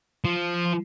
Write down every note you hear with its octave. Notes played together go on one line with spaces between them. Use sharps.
F3